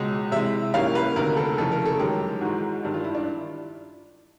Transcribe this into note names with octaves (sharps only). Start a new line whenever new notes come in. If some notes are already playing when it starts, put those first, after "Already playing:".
Already playing: C#2 B2 G#3 D#5
C3 E3 G#3 E5
G#2 E3 G3 A#3 C#4 F5
B4
D2 C3 D#3 A#4
A4
F2 C#3 E3 A3 A4
A#4
A4
F#2 D#3 G#3 G4
G#2 E3 G#3 F#4
G2 D#3 G3
F4
E4
D4